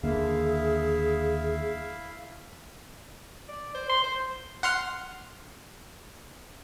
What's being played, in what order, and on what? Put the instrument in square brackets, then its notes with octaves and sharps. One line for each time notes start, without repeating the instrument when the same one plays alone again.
[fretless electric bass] D#2 D3 A#3 [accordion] E4 E5 F5 [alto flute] G#4
[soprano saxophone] D5
C5
C6
C5
[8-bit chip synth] F#5 C6 F6